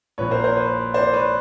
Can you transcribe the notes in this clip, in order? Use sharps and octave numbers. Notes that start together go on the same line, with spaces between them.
A#1 A#2 F3 B4 C#5
A#4 C5
A#4 C5
B4 C#5
C5 D5
B4 C#5